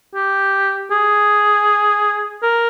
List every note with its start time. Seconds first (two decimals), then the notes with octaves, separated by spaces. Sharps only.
0.15 G4
0.91 G#4
2.43 A#4